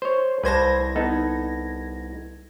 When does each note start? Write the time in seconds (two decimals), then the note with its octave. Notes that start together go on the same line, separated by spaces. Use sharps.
0.02 C5 C#5
0.43 C2 B4 C5 A5 G#6 A#6
0.96 B3 D#4 A4